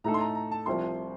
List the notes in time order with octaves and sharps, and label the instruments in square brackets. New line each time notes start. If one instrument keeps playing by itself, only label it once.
[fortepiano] A2 A3 D#4 A4 [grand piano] A#5
[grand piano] C6
A#5
A#5
A5
[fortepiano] C2 C3 F3 [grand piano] C6